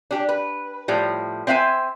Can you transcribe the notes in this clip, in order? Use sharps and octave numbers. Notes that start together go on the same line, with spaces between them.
D4 G4
B4
A2 F3 G3
C4 C5 E5 F5 G#5